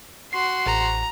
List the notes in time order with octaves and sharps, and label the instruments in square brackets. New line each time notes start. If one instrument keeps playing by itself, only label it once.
[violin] F#4 C6 [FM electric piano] C7
[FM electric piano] A1 [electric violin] A#5